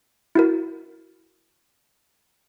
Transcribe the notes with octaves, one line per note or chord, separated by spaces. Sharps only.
E4 F#4 A#4